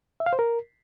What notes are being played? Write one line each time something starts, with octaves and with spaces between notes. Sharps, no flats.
E5
F5
C5
A#4